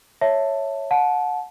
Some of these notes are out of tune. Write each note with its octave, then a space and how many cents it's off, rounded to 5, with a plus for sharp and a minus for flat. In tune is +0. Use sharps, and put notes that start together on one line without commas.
C#5 +0 E5 +0 A5 +10
F#5 -25 A5 -20